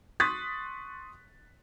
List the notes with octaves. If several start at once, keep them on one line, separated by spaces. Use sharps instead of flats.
C6 C#6 D#6 F#6 A6 B6